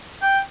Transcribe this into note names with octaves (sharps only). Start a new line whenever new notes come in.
G5